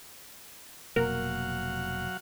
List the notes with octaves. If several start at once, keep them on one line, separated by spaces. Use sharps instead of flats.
F1 B2 F#3 A#3 A#4 F5 F#5